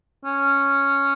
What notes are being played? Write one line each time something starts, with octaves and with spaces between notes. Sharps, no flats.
C#4